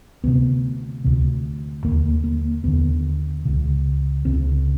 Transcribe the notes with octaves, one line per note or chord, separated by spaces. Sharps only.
D2 C3 B3
D2 C3
D#2 D3 A#3
A#3
D#2 D3 B3
C#2 C#3
C#2 C#3 C4